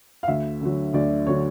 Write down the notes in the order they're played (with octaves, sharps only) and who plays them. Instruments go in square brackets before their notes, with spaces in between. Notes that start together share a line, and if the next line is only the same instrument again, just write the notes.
[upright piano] F5
D2 E5
D3 F#3
D2 D5
D3 F#3 C#5